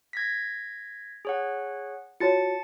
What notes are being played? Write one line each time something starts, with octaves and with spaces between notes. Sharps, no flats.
G#6 A#6 B6
G#4 C#5 F#5
F4 F#4 C#5 A5 A6 C#7